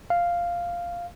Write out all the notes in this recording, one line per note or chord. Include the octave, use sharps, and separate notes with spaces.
F5